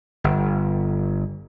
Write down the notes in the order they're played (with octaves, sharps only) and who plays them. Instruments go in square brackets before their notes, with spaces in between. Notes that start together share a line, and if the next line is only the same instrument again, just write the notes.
[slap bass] G1